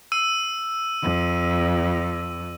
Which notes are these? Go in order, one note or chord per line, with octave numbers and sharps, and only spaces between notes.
E6 D#7
F2